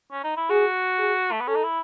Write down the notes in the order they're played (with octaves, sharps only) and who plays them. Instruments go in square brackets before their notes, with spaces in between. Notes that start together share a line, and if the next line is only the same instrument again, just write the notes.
[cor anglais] C#4
D#4
E4
[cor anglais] F#4 [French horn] G#4
[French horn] G#4
[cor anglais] A3
B3
[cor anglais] C#4 [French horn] A4
[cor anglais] D#4
E4